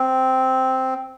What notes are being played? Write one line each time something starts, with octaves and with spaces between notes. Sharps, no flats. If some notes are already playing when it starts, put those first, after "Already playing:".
Already playing: C4